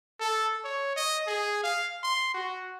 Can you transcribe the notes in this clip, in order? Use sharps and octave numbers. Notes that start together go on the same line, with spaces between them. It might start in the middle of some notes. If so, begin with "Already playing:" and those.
A4
C#5
D#5
G#4
F5
C6
F#4